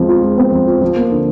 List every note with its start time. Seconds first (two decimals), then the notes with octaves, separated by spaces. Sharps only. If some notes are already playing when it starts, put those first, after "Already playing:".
Already playing: F3 G#3 C4
0.09 F4
0.23 G#3
0.38 C4
0.52 F3
0.67 F4
0.81 F3
0.96 A#3
1.11 D3